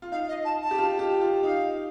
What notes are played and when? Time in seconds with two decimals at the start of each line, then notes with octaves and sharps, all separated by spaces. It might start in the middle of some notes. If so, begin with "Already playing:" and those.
0.02 F4
0.12 D#4 F5
0.28 D#5
0.45 A5
0.61 A5
0.71 G4
0.78 F4
0.99 G4
1.21 F4
1.43 D#4 F5